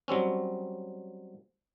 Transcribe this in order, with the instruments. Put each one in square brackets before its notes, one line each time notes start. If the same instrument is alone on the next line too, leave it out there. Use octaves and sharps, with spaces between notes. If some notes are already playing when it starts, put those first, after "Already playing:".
[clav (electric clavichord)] F#3 G3 C4 C#4